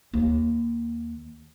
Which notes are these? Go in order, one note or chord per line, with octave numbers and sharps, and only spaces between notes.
D#2 A#3